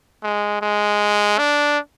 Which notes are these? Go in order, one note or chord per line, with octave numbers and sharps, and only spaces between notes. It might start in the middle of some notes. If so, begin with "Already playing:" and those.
G#3
G#3
D4